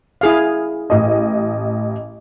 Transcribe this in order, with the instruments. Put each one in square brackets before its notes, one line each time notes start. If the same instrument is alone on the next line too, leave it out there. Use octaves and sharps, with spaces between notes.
[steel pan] E4 G#4 F5
[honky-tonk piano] A1 D#5